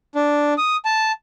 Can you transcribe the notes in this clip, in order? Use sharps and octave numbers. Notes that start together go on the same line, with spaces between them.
D4
D#6
A5